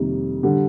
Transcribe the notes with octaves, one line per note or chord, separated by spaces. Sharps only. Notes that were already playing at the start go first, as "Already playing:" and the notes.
Already playing: F2 C3 D#3 G3 A#3
D3 G3